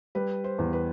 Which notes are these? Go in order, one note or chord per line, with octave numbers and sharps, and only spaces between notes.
G3 B4
C5
E2
B4